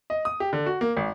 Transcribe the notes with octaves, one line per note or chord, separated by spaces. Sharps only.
D#5
D#6
G4
D3
F#4
A#3
G#1